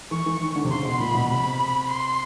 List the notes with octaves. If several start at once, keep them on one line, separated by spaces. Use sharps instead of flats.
E3 C#6
E3
D#3
D3
C3
C#3 C6
B2
A#2 B5
B2
C3 B5
C6